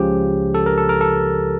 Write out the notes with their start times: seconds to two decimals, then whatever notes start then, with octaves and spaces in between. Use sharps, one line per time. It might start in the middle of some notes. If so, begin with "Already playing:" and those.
Already playing: C#2 C#3 F3 G4
0.54 A4
0.66 A#4
0.78 A4
0.89 A#4
1.01 A4